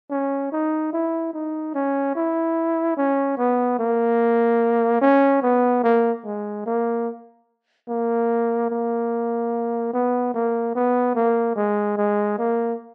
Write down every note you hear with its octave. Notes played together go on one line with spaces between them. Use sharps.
C#4
D#4
E4
D#4
C#4
E4
C#4
B3
A#3
C#4
B3
A#3
G#3
A#3
A#3
A#3
B3
A#3
B3
A#3
G#3
G#3
A#3